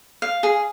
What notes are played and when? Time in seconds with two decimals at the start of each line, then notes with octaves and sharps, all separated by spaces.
0.22 F5
0.43 G#4